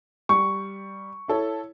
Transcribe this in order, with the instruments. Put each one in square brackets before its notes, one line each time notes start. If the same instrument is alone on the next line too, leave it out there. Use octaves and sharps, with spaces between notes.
[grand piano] G3 [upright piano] C#6
[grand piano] E4 A4 C#5